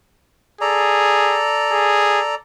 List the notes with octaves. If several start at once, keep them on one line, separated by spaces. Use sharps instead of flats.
G#4 A4 D5 A#5
G#4